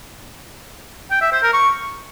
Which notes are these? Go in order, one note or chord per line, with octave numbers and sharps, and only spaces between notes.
G5
E5
C5
A#4
C#6